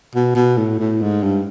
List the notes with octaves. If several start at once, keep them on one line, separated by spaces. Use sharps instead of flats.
B2
B2
A2
A2
G#2
G2